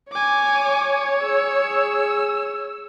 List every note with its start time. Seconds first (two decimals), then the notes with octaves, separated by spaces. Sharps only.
0.12 C#5 G#5 D6
1.23 G#4 E6